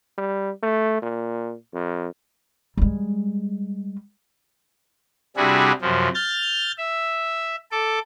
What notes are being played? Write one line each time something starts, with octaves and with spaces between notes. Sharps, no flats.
G3
A3
A#2
F2
G3 G#3
C3 G3 D4 E4 F#4 G#4
F#2 C3 F3
F6 G6 A6
E5
A4 D6